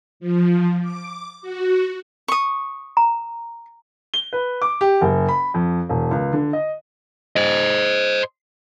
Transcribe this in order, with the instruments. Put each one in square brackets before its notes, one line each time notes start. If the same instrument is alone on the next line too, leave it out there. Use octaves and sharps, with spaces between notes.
[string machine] F3
D6
F#4
[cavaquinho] C#6 D#6
[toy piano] A#5
[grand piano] G7
B4
D6
G4
F#1
B5
F2
E1
C#2
D3
D#5
[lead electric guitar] C5 D#5